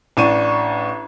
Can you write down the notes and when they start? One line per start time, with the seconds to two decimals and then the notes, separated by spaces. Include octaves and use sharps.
0.17 A1 D4 C#6 D#7